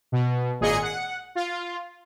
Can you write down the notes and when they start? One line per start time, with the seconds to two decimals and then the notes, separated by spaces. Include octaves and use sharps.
0.12 B2
0.60 G#1 A#2 G#4 D#5 C#7
0.82 F#5
1.35 F4